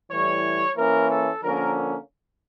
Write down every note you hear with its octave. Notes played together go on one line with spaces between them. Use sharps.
A2 E3 G3 C#5
E3 A#3 C#4 A#4
A4
D3 F3 A#3 C#4 A#4